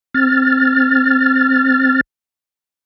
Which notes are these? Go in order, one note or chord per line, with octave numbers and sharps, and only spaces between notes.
C4 F6 A6